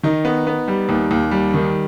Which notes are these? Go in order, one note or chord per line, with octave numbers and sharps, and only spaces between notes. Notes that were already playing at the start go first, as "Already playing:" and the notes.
D#3 D#4
B3
B3
G3
D#2
D#2
G3
D#3